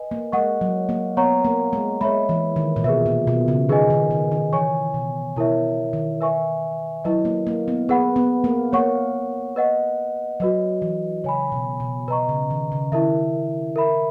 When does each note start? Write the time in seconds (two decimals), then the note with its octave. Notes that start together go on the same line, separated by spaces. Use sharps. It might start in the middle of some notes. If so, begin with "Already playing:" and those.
Already playing: B4 D#5 G#5
0.11 A#3
0.32 G#3 A#4 D#5 F#5 C#6
0.61 F#3
0.89 A#3
1.17 B3 C#5 F#5 A#5 C#6
1.45 A#3
1.73 G#3
2.01 G#3 C#5 E5 B5
2.29 E3
2.56 D#3
2.76 A#2
2.84 B2 G#4 B4 E5
3.06 A#2
3.27 B2
3.48 C#3
3.69 D#3 D#4 G#4 B4 D#5 G#5
3.90 D#3
4.11 D#3
4.32 D#3
4.53 E3 C#5 G#5 C#6
4.94 B2
5.36 B2 E4 A#4 C#5 E5
5.93 D#3
6.21 B4 E5 G#5 C#6
7.04 F#3 E4 B4 D#5
7.25 A#3
7.47 A#3
7.68 B3
7.89 B3 G#4 B4 F#5 B5
8.16 B3
8.44 A#3
8.72 A#3 C#5 F#5 C#6
9.56 B4 D#5 F#5
10.40 F#3 F#4 B4 D#5
10.82 E3
11.24 C#3 C#5 G#5 B5
11.52 B2
11.80 B2
12.08 B2 B4 D#5 A#5 C#6
12.29 C#3
12.50 D#3
12.72 C#3
12.92 D#3 E4 A#4 E5
13.76 A#4 E5 B5